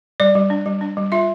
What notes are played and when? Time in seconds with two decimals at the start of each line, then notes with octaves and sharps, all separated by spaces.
0.20 G3 D5
0.35 G3
0.50 D4
0.66 G3
0.81 D4
0.97 G3
1.12 F4 E5